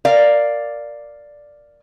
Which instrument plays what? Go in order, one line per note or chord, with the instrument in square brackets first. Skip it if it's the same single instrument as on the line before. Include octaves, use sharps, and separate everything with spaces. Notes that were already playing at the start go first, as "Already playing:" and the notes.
[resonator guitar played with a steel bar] A#4 D5 F5